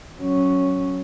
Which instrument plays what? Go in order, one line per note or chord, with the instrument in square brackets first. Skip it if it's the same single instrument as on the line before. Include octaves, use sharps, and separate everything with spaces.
[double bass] F#3 C#4